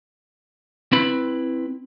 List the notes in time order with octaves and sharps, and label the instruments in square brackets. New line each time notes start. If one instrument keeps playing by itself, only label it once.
[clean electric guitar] C4 E4 B4 B5